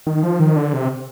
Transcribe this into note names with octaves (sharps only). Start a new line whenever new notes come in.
D#3
F3
D#3
D3
C3